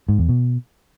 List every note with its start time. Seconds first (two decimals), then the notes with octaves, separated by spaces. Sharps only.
0.09 G#2
0.19 E2
0.29 B2